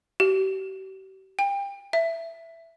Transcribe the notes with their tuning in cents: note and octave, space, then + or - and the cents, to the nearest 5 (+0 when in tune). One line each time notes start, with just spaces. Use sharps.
G4 -40
G5 +30
E5 +10